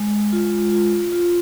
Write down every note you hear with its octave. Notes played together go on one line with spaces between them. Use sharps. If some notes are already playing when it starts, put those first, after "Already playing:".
Already playing: G#3
F4
F4
F4